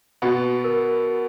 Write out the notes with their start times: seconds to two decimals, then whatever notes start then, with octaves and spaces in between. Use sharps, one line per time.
0.22 B2 B3 F#4
0.64 A#4
1.06 F#4